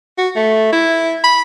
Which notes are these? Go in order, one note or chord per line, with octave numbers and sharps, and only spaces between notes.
F#4
A3
E4
B5